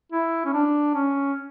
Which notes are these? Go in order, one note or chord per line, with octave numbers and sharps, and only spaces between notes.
E4
C#4
D4
C#4